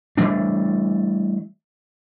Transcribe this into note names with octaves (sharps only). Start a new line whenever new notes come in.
E3 G3 A3 D4